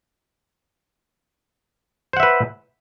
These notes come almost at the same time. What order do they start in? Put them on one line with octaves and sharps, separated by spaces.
C5 F#5 E5 B4